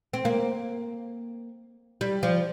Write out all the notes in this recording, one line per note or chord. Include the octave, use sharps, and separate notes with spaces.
C4
A#3
G3
F3